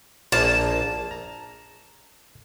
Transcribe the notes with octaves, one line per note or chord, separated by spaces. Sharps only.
A#1 A#3 G#4 A5
A#5